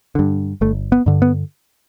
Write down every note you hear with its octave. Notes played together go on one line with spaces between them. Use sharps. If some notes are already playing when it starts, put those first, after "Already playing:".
G2 D3
G1 A3
B3
G2 D3
B3